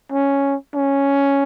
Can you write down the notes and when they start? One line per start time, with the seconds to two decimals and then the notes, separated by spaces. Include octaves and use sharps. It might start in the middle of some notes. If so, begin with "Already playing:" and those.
0.12 C#4
0.75 C#4